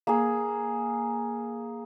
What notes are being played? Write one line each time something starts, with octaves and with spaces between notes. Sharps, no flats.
A#3 G#4